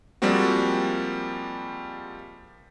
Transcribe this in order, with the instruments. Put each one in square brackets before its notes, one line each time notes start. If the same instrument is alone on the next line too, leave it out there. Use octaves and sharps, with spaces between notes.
[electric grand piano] F3 G3 G#3 A#3 C4 F#4